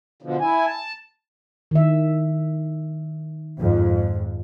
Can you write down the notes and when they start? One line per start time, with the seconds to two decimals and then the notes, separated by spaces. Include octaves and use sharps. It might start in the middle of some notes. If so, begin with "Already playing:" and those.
0.22 B2 D3 F3
0.40 E4 G#5
0.67 A5
1.71 D#3 E5
3.59 F2 G#2